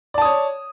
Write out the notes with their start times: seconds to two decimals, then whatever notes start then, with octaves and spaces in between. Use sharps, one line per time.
0.14 D5
0.18 A5
0.21 D#6
0.25 C#5